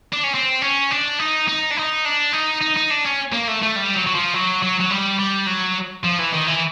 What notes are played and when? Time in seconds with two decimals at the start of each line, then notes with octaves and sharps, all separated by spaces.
0.12 D4
0.23 C#4
0.34 C4
0.62 C#4
0.91 D4
1.20 D#4
1.48 D#4
1.71 D4
1.77 D#4
2.05 D4
2.33 D#4
2.62 D#4
2.77 D#4
2.91 D4
3.05 C#4
3.33 A#3
3.48 A3
3.63 A3
3.76 G3
3.95 F#3
4.06 F#3
4.15 F3
4.34 F#3
4.63 F#3
4.81 F#3
4.91 G3
5.19 G3
5.47 F#3
6.04 F3
6.19 E3
6.33 D#3
6.47 E3